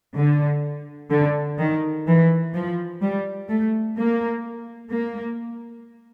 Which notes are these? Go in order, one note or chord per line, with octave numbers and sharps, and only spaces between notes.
D3
D3
D#3
E3
F3
G3
A3
A#3
A#3